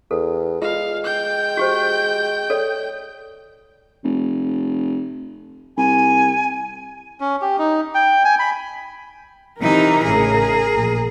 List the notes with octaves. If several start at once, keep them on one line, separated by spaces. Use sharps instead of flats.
E2 A4
G#3 F4 F5
G5 G6
F#4 G4 C5
A4 C#5 D5
F1
C2 G#5
C#4
G4
D#4
G5
G#5
B5
C3 E3 D#4 A#4
A1 A2 C#3 G#4
A#1